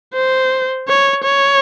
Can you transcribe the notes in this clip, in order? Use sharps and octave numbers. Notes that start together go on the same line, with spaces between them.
C5
C#5
C#5